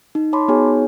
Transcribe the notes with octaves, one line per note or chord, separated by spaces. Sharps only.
D#4
C#5 A5 B5 C6 D6
B3 D#4 F#4 G#4 C#5 G#5